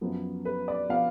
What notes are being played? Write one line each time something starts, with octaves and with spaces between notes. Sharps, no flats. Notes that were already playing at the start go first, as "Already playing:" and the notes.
F#2 F3 B3
B4
D5
F3 B3 F5